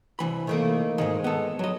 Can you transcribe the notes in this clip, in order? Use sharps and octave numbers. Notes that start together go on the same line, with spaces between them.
C2 E3 B5
D#3 A3 A#3
G#2 D#3 G#3
B3 A4
F#3 D#5